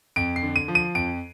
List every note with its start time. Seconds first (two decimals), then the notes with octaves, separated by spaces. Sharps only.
0.16 F2 D7
0.36 C7
0.43 D3
0.56 D#7
0.68 F3
0.75 D#7
0.95 F2 D7